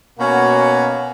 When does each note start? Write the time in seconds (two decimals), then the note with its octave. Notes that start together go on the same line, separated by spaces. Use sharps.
0.19 B2 A#3 C#4 F#4